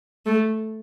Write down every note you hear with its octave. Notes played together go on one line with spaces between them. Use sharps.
A3